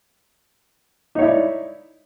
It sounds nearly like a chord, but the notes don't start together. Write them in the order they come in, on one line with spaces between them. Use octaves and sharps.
D#4 C#5 E4 D5